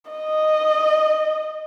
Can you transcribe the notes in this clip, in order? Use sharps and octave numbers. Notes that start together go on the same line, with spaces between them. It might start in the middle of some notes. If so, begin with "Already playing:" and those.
D#5